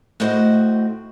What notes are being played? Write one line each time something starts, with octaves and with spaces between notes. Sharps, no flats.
A2 A3 C4 F#4 C5 D#5